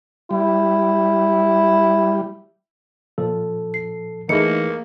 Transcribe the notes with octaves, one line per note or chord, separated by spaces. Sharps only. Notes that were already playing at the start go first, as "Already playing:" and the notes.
G3 E4
A#2 F3 A4
C7
E3 A3 A#3 D#4 E4 G#4 C#7